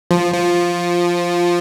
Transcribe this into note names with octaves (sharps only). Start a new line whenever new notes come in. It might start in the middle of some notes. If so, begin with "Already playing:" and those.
F3
F3